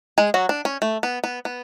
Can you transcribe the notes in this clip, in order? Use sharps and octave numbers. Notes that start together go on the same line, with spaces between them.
G#3 G#4
F#3 F#4
D4
C#4
A3
B3
B3
B3